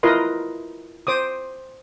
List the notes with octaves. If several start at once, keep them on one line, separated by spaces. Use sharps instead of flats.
E4 F4 A#4 B4 D#5 C6
C5 D6 D#6